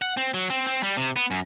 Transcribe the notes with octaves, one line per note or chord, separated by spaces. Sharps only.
F#5
C4
F#3
C4
C4
G3
C3
B3
F#2